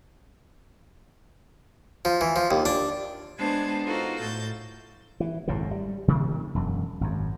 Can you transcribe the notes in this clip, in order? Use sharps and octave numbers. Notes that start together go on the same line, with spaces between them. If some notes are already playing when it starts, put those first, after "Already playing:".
F3
E3
F3
D#2
D4
G#3 B3 D4 C5 A5 G#6
D#4 F4 F#4 A4 A#4 C5
A2 G6 A6
E3
G#1 F#2 A2 C#3
G3
C3 D#3 F3 A#3
E1 F#2
G#1 F#2